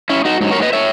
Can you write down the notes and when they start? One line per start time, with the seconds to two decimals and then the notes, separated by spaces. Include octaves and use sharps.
0.09 C#4 E4
0.25 D#4 F#4
0.41 G#2 F#3
0.51 A#4 C#5
0.62 B4 D#5
0.73 C#5 E5